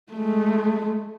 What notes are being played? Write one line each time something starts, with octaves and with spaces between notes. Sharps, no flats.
G#3 A3